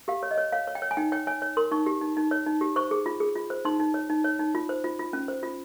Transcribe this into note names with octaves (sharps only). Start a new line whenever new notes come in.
G4 F5
C#5
D#5
C#5
C#5 F5
C#5
G5
C#5
G#5
D#4 G5
C#5 G5
C#5 G#5
C#5
A#4 C6
D#4 C#6
G4
D#4
D#4
C#5
D#4
G4
C5 C#6
G#4
F4
G#4
F4
C5
D#4 C6
D#4
C#5
D#4
C#5
D#4
F4
C5
F4
F4
C#4
C5
F4